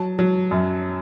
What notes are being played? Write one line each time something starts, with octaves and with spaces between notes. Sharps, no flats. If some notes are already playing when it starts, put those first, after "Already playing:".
Already playing: F#3 A5
F#3
F#2